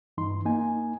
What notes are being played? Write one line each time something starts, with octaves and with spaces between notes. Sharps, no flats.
G2 E3 D#4 C6
A#3 D#4 G#5